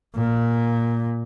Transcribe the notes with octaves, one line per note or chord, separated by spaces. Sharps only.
A#2